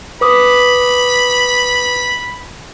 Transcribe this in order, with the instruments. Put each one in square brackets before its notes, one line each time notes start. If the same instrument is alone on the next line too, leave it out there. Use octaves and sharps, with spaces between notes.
[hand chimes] B4 D6 D#6 [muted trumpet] B5